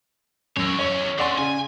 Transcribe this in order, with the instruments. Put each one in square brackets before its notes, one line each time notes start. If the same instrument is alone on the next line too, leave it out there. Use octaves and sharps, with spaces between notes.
[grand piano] F#2 E6 [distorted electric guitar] A#4 C#5
[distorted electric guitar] E2 C#4 [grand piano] C#5 C#6
[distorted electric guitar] D3 C#4 [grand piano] D5 F#5 C6
[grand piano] C#3 [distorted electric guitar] G#5